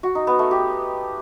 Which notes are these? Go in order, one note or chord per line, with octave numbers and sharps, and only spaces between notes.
F#4
D#4
B3
A3
G4